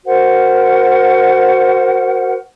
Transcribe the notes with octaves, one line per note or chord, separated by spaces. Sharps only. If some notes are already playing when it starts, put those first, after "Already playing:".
F#4 A#4 C5 F#5